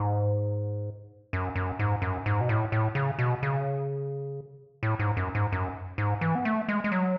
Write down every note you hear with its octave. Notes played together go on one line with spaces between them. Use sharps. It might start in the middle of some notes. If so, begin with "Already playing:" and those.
Already playing: G#2
F#2
F#2
G#2
F#2
G#2
B2
A2
A2
C#3
B2
C#3
A2
G#2
F#2
G#2
F#2
G#2
E3
B3
A3
G#3
G#3
F#3